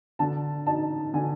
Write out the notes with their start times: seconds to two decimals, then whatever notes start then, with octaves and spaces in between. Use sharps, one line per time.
0.19 D3 A5
0.67 D#4 A5
1.14 D3 G#5